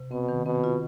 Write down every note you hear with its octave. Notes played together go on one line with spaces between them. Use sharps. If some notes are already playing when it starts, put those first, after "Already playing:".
Already playing: C3
B2 C4
D#3
B2 C4
F4